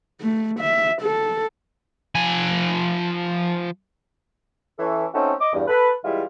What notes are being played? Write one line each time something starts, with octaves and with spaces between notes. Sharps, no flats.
A3
E5
A4
F3 G#5
E3 C#4 A4
A3 C4 C#4 D#4 F#4 A4
D#5 D6
E2 G2
A4 B4
E3 G3 G#3 E4 F4